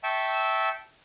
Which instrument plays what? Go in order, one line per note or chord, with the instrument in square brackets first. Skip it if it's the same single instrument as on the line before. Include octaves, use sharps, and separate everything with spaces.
[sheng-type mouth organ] E5 G5 A5 C#6 E6